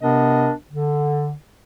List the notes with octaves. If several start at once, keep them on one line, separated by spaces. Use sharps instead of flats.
C3 B3 D4 A#4 D#5
D3